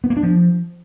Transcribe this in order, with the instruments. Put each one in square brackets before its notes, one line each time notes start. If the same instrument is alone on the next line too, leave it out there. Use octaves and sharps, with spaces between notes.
[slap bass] B3
A#3
D4
F3